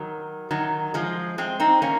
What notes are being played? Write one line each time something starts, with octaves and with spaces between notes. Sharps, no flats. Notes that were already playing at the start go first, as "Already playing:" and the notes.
Already playing: D#3 F#3
D#3 F#3
F3 G#3
G#3 C4
C4 D#4
A#3 C#4